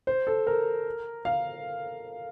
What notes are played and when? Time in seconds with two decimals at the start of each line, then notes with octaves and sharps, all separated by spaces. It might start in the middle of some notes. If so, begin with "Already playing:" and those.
0.07 C5
0.27 A4
0.47 A#4
1.25 F5